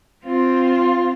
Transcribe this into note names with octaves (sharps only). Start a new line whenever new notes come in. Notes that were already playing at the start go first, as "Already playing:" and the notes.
C4 F4